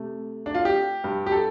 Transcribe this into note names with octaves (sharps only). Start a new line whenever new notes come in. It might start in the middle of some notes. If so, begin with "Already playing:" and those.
Already playing: C3 A3
D4
F4
G4
G2 G3
G4
A4